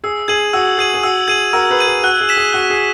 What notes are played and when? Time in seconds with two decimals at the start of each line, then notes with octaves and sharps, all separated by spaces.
0.04 G#4 E6
0.28 G#4 G#6 D#7 F#7
0.53 F#4 E6
0.78 G#4 G#6 D#7 F#7
0.94 G#4
1.03 F#4 E6
1.28 G#4 G#6 D#7 F#7
1.53 F#4 A#4 E6
1.71 G#4 B4
1.79 G#6 D#7 F#7
1.87 G#4
2.03 F#4 F#6
2.21 G#4
2.29 B6 E7
2.37 G#4
2.53 F#4 F#6
2.70 G#4